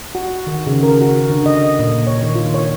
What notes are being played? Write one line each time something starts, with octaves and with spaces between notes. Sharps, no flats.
F#4
D#3
C#3
A#4
F#4
D3
D#5
A#2
C#5
D#3
F4
C#5